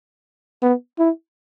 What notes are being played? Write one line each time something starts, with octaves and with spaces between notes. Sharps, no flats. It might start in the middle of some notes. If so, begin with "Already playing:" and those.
B3
E4